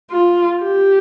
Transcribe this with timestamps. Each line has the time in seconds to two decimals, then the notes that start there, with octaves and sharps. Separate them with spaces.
0.11 F4
0.61 G4